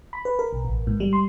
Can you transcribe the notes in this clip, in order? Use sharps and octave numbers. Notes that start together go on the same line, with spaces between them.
B5
B4
A#4
B1
A1
G#2
G3
C6